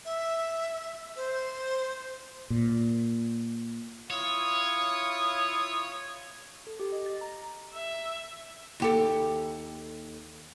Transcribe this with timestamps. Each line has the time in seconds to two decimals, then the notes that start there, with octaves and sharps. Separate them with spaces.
0.05 E5
1.16 C5
2.50 A#2
4.11 E4 F4 C#5 D#6
6.67 A4
6.80 G4
6.92 D#5
7.06 A6
7.21 A#5
7.73 E5
8.80 D#2 G4 A4